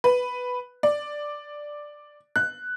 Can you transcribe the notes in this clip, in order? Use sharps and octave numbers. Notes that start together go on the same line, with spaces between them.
B4
D5
F#6